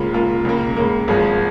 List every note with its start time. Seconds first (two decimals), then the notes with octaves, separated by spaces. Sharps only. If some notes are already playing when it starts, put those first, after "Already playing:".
Already playing: C#2 C#3 A#3 F4
0.13 C#2 C#3 A#3 F4
0.45 C#2 C#3 A#3
0.76 C#2 C#3 A#3
1.08 G#1 G#2 F3 G#3